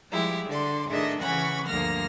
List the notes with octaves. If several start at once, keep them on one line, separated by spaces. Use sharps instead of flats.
F3 G3 G#3 E4 G4
D3 D5 C6
A2 D#3 D4 G#4 D#5 E5
C#3 E3 C#4 F#5 B5 C#6
D2 G2 F3 A#3 F6 A#6